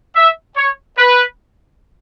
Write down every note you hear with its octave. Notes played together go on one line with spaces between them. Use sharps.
E5
C#5
B4